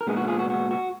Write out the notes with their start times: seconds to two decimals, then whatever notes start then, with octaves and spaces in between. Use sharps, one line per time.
0.01 A#4
0.07 A#2 G#3 B3 D#4 F4 G#4
0.17 F#4
0.28 F4 G#4
0.39 F#4
0.50 F#4
0.71 F#4